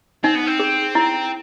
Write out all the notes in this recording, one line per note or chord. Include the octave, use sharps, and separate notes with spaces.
C4 D#4
B3
C4
G#4
E4